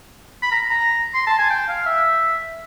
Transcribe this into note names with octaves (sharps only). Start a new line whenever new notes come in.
B5
A#5
A#5
C6
A5
G#5
G5
F5
E5